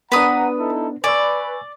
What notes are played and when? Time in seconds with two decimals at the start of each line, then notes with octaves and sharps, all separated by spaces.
0.12 B3 D4 B4 F#5 A#5 D#6
0.59 D#4 E4 A4
1.04 B4 D5 G#5 C#6 E6